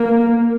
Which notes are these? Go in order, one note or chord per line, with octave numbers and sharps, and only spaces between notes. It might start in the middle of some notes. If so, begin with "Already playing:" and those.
Already playing: A#3